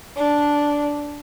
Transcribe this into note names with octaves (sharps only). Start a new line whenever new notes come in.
D4